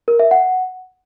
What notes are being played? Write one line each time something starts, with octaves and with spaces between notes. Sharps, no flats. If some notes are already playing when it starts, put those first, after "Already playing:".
A#4
E5
F#5